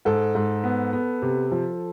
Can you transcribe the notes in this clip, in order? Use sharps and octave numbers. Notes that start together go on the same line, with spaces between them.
G#2 A4
G#2
B3
B3
C3
F3